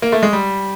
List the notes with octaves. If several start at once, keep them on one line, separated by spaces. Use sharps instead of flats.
A#3
A3
G#3
G3